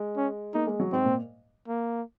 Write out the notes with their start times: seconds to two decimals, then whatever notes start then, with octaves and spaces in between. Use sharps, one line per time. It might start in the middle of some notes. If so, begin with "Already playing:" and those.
Already playing: G#3
0.16 C#4
0.54 A#3 D#4
0.67 G#3
0.80 F#3
0.92 G#2 C4
1.05 A#2
1.68 A#3